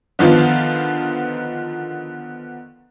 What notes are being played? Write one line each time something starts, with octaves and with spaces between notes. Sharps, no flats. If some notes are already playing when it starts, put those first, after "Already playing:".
D3 D#3 F3 B3 F4